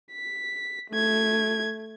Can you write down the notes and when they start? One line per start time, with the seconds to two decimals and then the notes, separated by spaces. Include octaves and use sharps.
0.13 B6
0.90 A3 G#6